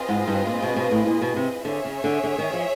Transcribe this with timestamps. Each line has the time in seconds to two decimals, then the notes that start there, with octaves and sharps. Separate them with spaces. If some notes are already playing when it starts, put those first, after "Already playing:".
Already playing: C4 F4 G#4 B4 D#5
0.09 G#2
0.28 G2
0.47 A#2
0.62 B2
0.76 B2
0.91 A2
1.07 A#2
1.22 B2
1.36 C3
1.65 D3 G#4 C#5 E5
1.85 C#3
2.04 D3
2.24 D3
2.38 D#3
2.53 F3